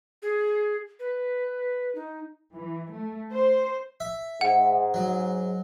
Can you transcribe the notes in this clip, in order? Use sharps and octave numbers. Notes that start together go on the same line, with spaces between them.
G#4
B4
D#4
E3
A3
C5
E5
G#2 G#4 F#5
F#3